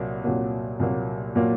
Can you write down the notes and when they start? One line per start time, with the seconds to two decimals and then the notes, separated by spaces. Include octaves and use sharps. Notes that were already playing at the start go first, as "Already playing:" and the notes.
Already playing: C2 A#2 F#3 A#3
0.24 C2 A#2 F#3 A#3
0.80 C2 A#2 F#3 A#3
1.35 A#2 F#3 A#3